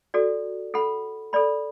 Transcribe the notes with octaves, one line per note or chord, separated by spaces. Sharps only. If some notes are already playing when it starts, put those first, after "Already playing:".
F#4 A4 D5
A4 F#5 B5
A4 D5 B5